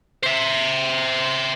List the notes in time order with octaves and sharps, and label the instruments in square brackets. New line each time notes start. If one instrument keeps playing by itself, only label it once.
[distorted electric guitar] C5 E5